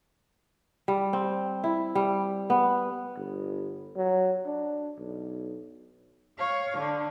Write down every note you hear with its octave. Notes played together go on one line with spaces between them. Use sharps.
G3
C4
E4
G3
B3
G1
F#3
D4
B1
C#5 F5
D3